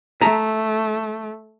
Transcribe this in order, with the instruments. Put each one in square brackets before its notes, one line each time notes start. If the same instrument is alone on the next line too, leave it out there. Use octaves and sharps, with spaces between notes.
[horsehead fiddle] A3 [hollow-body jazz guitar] E5 A5 A#5